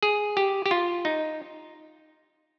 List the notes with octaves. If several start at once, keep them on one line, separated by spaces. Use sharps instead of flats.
G#4
G4
G4
F4
D#4